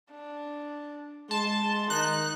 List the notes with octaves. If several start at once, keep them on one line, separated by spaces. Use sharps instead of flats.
D4
G#3 A5 C6
D#3 D#4 F#6